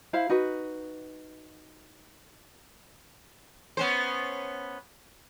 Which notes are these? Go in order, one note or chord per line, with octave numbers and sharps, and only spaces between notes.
E4 C5 F5 B5
D#4 F#4 B4
B3 C#4 C5